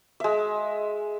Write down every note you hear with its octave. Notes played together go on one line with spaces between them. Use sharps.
G#3 E5